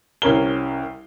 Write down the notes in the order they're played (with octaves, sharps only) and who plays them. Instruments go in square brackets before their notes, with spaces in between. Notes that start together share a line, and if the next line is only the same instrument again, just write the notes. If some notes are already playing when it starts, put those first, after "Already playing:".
[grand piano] C2 C#4 A#4 G7